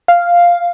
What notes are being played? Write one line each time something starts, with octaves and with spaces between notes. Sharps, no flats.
F5